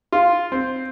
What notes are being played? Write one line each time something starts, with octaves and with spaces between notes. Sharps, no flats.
F4
C4